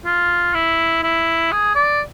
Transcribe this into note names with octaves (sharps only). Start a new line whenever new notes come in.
F4
E4
E4
G#4
D5